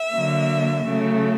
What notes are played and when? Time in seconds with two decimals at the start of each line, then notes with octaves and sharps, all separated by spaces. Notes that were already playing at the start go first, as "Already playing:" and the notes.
Already playing: E5
0.11 D3 F#3 A#3
0.85 C#3 F#3 A3